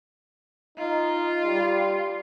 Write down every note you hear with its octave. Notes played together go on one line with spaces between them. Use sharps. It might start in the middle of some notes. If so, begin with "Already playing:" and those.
D#4 F4
G3